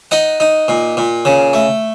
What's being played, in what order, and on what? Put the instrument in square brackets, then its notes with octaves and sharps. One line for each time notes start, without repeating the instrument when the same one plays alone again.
[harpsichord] D#4 D#5 F#5
D#4
A#2
A#2
C#3
A3